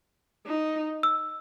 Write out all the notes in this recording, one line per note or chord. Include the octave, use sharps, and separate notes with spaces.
D#4
E6